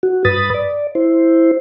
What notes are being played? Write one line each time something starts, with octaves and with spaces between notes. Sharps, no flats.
F#4
G2 B4 B5 D#6 A6
D5
E4 C5